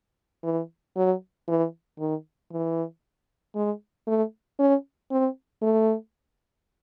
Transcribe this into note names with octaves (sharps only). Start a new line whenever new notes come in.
E3
F#3
E3
D#3
E3
G#3
A3
C#4
C4
A3